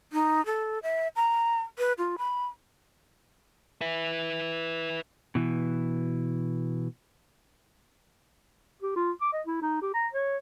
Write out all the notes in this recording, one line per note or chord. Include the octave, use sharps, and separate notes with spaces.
D#4
A4
E5
A#5
B4
F4
B5
B4 E5
B2 E3
G4
F4
D6
D#5
E4
D#4
G4
A#5
C#5